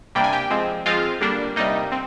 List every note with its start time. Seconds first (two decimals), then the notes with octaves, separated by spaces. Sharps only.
0.15 C3 G3 A#3 D4 G5
0.24 G#5
0.33 G4 G5
0.50 F3 G#3 C4
0.86 F3 G#3 C4 F4 F5
1.21 D3 G3 A#3 D4
1.56 C3 G3 A#3 D#4 D#5
1.92 C4